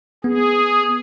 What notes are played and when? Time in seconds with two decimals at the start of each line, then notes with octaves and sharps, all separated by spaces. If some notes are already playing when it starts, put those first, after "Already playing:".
0.24 B3 G#4